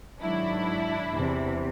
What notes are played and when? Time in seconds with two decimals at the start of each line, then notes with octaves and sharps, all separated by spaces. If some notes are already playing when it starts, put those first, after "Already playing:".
0.21 G#2 D#3 F#3 D4 E4
1.12 E2 C3 E3